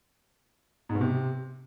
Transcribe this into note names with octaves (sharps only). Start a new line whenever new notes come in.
G#2
B2
C3